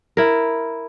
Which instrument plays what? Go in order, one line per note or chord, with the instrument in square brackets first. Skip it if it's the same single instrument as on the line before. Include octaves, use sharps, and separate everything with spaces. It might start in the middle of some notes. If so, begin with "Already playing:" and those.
[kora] E4 A#4